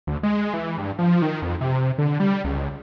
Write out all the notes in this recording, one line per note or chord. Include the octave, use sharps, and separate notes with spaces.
D2
G#3
E3
G2
F3
D#3
F2
C3
D3
G3
C#2